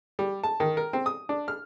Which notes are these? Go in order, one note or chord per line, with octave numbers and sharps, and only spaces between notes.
G3
A5
D#3
A#4
C4
D#6
D4
F6